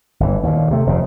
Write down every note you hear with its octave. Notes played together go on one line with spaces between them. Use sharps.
G1 E3
D#2 A#2
C3 A3
F1 F2 C#3